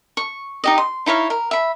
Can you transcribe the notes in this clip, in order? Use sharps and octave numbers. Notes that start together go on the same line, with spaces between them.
C#6
D#4 G4 D#5
C6
D#4 E4 C#5 F5
A#4
E5 B5